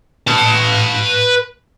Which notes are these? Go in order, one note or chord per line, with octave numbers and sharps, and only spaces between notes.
B4 A5